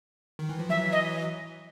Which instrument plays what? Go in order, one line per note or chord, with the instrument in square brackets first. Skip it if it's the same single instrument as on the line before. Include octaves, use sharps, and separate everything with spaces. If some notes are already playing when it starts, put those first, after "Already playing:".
[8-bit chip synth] D#3
E3
F3
[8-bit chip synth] E3 F#3 [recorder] E5
[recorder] D#5